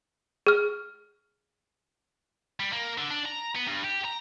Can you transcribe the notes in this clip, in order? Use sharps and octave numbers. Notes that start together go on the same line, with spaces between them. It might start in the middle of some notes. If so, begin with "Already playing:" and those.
G#4 F6
G3
A#3
D3
D4
A#5
B3
G2
G4
A#5